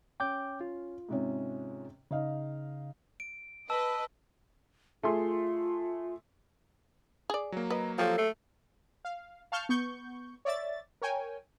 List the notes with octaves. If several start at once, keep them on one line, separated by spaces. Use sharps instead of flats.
C#4 G5 D6 G6
F4
G#2 C3 C#4
C#3 D#4 D#5 F5
D7
B4 D#5 A5 E6
A3 F4 G#4 C6
G#4 D5
F#3 A#3
B4 D#5 A#5
F3 C4 G4 A4 C#5
A3 C7
F5
F5 A5 C#6 F6 G6
B3 C#6 G6
C#5 D5 E5 A6
A#4 C#5 G5 G#5